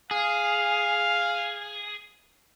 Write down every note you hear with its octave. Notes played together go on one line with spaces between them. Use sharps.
G#4 F5